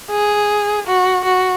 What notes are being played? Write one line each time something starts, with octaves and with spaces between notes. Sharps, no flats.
G#4
F#4
F#4